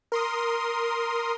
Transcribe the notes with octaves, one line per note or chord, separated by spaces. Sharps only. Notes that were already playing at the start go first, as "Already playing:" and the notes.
A#4 C6 D#6